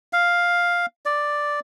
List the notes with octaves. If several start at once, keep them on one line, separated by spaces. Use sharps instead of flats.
F5
D5